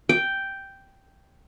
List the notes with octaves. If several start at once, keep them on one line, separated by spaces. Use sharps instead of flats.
G5